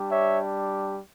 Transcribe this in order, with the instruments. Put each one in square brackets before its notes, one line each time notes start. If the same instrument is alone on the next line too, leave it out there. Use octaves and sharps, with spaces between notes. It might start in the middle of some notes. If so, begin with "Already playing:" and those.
Already playing: [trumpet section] G3 D4 G4
C#5 E5